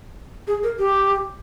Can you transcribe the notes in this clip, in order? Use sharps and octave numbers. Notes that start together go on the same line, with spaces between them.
G#4
A#4
G4